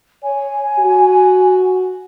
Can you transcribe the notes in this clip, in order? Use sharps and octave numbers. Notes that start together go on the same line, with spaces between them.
C#5 G#5
F#4